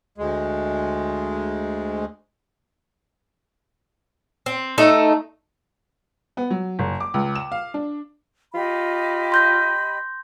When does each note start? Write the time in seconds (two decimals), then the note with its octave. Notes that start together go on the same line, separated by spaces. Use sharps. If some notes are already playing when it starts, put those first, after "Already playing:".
0.18 D2 G#3
4.46 C4
4.78 A3 D#4 A4
6.37 B3
6.50 F#3
6.79 F#1
7.00 D6
7.14 C#2
7.36 E7
7.52 F5
7.74 D4
8.54 F4 G4 D#5 B5
9.32 C6 G6 A#6